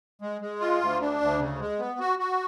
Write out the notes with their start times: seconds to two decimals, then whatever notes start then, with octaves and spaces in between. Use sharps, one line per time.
0.22 G#3
0.41 G#3
0.60 F4
0.81 D2
1.01 D4
1.21 D2
1.40 C#3
1.60 G#3
1.79 B3
1.99 F#4
2.19 F#4